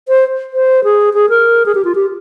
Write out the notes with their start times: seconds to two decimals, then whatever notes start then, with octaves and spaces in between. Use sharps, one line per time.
0.08 C5
0.54 C5
0.84 G#4
1.14 G#4
1.29 A#4
1.66 G#4
1.75 G4
1.85 F4
1.95 G4